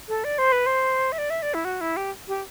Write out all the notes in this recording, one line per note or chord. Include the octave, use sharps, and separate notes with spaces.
A4
D5
C5
B4
C5
E5
D5
E5
D5
E4
F#4
E4
G4
G4